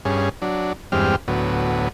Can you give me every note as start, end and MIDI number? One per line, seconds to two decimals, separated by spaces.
0.05 0.29 43
0.05 0.29 61
0.05 0.29 68
0.42 0.73 54
0.42 0.73 62
0.92 1.16 40
0.92 1.16 43
0.92 1.16 56
0.92 1.16 60
0.92 1.16 67
0.92 1.16 89
1.28 1.89 38
1.28 1.89 45
1.28 1.89 54
1.28 1.89 59